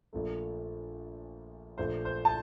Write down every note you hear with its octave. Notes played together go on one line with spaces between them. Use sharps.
A#1 A#2 A3
A#1 A#2 A3 C5
C5
A5